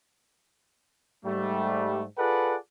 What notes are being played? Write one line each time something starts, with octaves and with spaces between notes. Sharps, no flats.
G#2 G3 A3
F4 G#4 A4 B4 D5 F#5